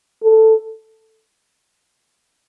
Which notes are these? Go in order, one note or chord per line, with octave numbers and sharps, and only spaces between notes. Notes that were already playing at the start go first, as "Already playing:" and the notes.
A4